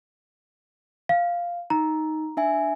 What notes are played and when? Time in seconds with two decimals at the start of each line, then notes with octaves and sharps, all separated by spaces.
1.09 F5
1.70 D#4 A#5
2.37 D4 E5 G#5